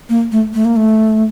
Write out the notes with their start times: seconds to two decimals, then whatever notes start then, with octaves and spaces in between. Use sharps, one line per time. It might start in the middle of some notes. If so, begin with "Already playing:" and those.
0.09 A#3
0.32 A3
0.54 A3
0.65 A#3
0.76 A3